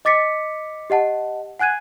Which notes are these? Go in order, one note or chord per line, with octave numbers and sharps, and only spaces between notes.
D#5 D6 A6 B6 C#7
G4 D#5 F#5 A5
F#5 G#5 F#6 G#6 D#7